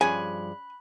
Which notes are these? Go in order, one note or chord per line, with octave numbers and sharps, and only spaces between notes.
G2 F3 C#4 G#4 G#5 B5 F#6